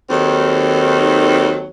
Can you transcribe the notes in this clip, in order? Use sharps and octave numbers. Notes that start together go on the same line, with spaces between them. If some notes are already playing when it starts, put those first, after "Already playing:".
D#2 D#3 F#3 C4 A4